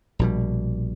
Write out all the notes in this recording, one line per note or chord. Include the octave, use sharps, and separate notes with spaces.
A#1 B2 G3